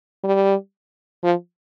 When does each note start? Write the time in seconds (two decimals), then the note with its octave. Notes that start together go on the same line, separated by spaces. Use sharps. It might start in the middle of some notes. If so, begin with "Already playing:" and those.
0.24 G3
1.24 F3